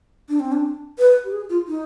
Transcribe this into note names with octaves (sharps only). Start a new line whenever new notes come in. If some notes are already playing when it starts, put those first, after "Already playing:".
D4
C4
D4
B4
G4
G#4
F4
D#4